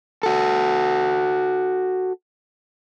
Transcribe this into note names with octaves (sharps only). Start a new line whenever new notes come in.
F#4 A4